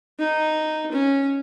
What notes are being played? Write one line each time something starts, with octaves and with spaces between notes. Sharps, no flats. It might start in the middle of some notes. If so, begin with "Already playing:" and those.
D#4
C#4